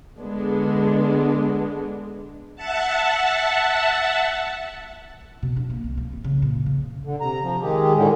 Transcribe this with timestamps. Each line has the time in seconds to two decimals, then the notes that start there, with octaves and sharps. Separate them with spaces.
0.20 D3 G#3 B3 D4
2.55 E5 F#5 A5
5.43 B2
5.57 D4
5.70 A#3
5.84 C2
5.98 A#3
6.13 D1
6.24 C#3
6.42 A#2
6.66 C#3
7.05 D3
7.21 C3 A#5
7.43 F3
7.62 D#3 G#3 G4 G#4
7.96 A2 D3 D#3 G#3